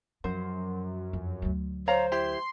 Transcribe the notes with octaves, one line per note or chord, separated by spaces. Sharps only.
F#2 F3 C5
F2
D2 F#3
C5 C#5 F5 A#5
E4 G4 C6